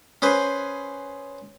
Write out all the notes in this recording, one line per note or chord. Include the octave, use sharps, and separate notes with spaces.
C#4 G#4 B4 C5